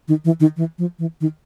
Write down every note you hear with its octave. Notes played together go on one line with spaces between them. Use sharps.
D#3
E3
D#3
E3
F3
E3
D#3